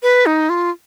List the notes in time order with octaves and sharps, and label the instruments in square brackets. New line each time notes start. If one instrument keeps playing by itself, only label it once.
[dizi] B4
D#4
F4